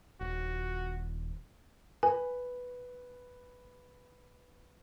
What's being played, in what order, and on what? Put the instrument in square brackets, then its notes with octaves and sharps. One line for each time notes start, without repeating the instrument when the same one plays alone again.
[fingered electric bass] D#1 [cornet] F#4
[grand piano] B4 [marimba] G#5